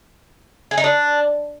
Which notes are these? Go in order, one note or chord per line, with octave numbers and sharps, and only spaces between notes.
G#4
D#4
D4